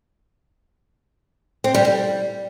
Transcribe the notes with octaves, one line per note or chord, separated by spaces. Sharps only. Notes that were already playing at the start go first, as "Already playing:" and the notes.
C4
G3
G3